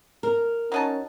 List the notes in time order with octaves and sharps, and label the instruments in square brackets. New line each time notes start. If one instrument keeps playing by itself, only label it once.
[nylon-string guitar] A#4
[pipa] F#3 D#4 A5 [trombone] C#4